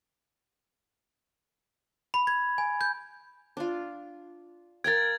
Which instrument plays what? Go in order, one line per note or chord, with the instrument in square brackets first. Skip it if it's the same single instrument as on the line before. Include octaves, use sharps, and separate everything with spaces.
[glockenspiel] B5
G#6
G#5
G6
[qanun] D4 F4
[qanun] A#4 F5 G5 [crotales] G#6 A6